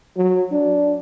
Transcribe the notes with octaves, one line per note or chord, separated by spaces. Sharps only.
F#3
D4